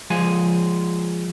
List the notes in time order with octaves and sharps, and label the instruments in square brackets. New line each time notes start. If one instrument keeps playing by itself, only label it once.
[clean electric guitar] F3 G#3 G#5